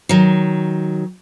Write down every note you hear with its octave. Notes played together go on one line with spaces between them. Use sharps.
D#3 F#3